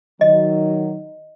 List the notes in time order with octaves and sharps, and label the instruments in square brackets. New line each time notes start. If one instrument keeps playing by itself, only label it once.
[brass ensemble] D#3 F#3 [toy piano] D#5